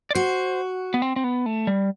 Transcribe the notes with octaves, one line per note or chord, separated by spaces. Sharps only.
D5
F#4 C5
B3
C4
C4
B3
A3
G3